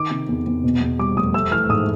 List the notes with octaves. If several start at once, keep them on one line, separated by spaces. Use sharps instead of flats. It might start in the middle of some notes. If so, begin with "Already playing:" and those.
Already playing: D#3 D6
C3
E2
E2
B2
E2
G3 D6
F1 D#6
A3 E6
E3 F6
G#2 D#6